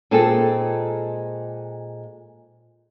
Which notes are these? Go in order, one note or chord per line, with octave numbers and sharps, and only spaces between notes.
A#2 G#3 C4 D#4 G#4 A4